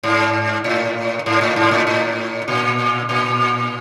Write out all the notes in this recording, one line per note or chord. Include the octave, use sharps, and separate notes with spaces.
G#2
A2
G#2
A2
G#2
A2
A2
A#2
A#2